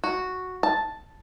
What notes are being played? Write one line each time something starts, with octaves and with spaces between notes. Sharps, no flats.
F#4
A5